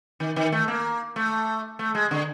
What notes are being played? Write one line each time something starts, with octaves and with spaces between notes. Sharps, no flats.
D#3
D#3
A3
A#3
A3
A3
G#3
D3